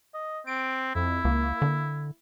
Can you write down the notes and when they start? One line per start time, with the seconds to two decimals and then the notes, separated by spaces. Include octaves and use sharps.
0.14 D#5
0.47 C4 D7
0.95 F2 E4
1.25 C#2 A#3
1.62 D3